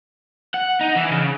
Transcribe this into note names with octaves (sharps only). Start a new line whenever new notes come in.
F#5
D#4
E3
C#3